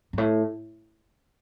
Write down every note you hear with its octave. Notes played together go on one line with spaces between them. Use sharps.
G2
A2